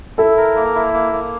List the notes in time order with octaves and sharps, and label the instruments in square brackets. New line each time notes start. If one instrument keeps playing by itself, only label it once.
[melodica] E4 [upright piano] A4
[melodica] A#4
A#3
E4
A#3
A#3